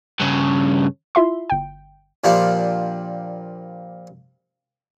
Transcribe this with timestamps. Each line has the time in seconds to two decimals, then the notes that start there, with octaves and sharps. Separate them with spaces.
0.20 G2 C#3
1.15 E4 F4 E5 C6
1.50 G1 G5
2.24 A#2 F3 G3 D4 F4